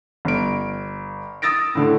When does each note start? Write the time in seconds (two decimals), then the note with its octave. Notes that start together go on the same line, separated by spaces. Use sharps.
0.25 G1 D7
1.42 D#6 E6 A6 A#6 D7
1.75 A2 D3 A3